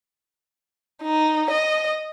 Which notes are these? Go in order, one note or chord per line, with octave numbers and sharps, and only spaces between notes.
D#4
D#5